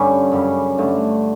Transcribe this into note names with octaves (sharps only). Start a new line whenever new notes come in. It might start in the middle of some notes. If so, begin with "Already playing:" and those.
Already playing: G2 D3 G3 C#4
F#2 C#3 G3
G2 D3 A3